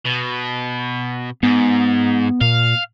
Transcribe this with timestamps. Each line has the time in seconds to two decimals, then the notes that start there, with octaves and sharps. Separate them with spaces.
0.05 B2
1.43 G#2 B3
2.41 A#2 F5